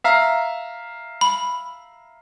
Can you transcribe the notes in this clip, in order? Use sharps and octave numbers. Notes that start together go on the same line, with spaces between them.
E5 F5 A#5
B5